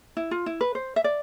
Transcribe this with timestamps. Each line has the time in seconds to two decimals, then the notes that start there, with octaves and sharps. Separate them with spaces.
0.17 E4
0.31 F4
0.46 E4
0.61 B4
0.75 C5
0.96 E5
1.04 D5